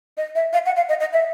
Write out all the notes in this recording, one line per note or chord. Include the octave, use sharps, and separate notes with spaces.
D#5
E5
F5
F#5
F5
D#5
D#5
E5